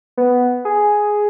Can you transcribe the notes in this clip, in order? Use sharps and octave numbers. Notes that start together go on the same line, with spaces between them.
B3
G#4